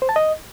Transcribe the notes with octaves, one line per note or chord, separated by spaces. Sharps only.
C5
A5
D#5